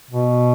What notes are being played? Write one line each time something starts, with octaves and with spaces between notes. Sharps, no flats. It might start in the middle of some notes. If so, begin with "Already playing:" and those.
B2